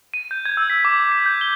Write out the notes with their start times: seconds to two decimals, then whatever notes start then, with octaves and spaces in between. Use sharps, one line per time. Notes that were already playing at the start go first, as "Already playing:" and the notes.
0.14 D#7
0.31 G6
0.45 G#6
0.57 E6
0.70 B6
0.85 D6
1.00 D6
1.12 B6
1.26 G6
1.41 G7